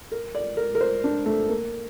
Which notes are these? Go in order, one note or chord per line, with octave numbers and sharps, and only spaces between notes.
A#4
D5
A#4
A#4
C5
D4
A3
A#3